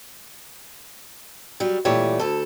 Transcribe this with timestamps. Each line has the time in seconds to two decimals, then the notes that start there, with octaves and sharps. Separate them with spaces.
1.60 F#3 G3
1.85 A#2 E3 G3 A3 C#5
2.20 D2 A4